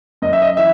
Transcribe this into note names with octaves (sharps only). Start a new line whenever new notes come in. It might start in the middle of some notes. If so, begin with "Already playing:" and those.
F#2 D#5
E5
D#5
E3 E5